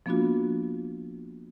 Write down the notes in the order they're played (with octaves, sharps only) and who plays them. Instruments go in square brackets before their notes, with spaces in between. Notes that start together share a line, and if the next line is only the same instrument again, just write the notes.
[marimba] F3 A#3 B3 D4 F4 F#4